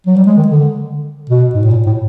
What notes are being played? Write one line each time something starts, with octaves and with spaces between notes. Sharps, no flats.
F#3
G3
G#3
D#3
D3
B2
G#2
A2
A#2
A2